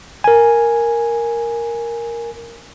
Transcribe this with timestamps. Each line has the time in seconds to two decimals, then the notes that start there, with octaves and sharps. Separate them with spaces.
0.24 A#4 G#5